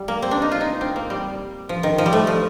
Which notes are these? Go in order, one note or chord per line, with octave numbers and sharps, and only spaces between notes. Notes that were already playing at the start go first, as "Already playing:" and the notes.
Already playing: G3
A#3
C4
D4
D#4
F4
D#4
C4
A#3
G3
F3
D#3
F3
G3
A3
F3